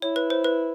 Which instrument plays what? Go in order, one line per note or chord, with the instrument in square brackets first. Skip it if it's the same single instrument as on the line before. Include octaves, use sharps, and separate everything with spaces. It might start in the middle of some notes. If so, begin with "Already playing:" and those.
[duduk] E4 [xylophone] C#5
[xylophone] B4
C5
B4